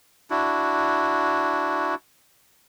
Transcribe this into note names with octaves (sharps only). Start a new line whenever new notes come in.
D4 E4 F#4